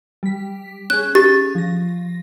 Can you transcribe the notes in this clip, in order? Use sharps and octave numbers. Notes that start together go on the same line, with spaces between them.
G3 B6
C#4 G#4 F#6
G4 A6
F3 A#6